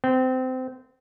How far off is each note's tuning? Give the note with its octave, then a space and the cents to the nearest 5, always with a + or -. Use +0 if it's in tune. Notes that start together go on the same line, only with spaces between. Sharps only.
C4 -25